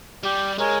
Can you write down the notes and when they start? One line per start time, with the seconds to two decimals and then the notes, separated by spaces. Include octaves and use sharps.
0.23 G3 G4
0.58 G#3 A#4 C#5 G#5